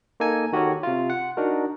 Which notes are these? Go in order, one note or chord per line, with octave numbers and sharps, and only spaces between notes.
A#3 D#4 A4 G#5
D#3 F#4 G4 A4 A#4 C#5
C3 F4
F#5
D4 D#4 F#4 A#4